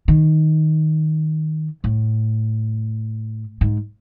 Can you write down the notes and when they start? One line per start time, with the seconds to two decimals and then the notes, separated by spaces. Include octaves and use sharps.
0.08 D#3
1.84 A2
3.61 G#2